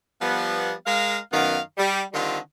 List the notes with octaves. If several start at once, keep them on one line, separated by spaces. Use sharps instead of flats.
F3 G3 B3
G#3 A#4 F5
F#2 D#3 B3 F5
G3
D3 D#3 G3 C4 F4